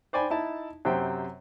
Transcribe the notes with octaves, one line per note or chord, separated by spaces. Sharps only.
C5 D5 G5 G#5 B5
D#4 E4 A5
F#2 C3 C5 G5